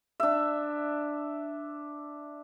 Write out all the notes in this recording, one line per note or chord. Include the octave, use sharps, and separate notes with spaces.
D4 E5